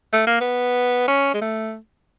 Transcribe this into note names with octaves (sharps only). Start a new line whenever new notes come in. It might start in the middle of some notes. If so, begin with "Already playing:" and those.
A3
A#3
B3
C#4
G#3
A3